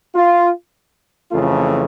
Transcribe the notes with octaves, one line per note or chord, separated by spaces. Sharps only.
F4
F2 C#3 E3 A3 F4